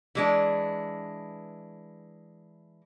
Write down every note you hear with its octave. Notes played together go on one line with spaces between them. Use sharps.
E3 G#3 D4